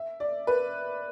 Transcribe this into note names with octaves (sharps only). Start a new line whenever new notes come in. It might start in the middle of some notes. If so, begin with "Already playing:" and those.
Already playing: E5
D5
B4